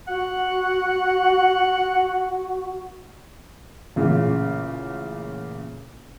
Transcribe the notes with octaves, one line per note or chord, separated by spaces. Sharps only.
F#4 F#5
A1 A#2 C#3